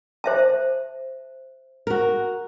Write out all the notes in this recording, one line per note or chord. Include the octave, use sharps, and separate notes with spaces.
C5 E5 A5
F#4 A#4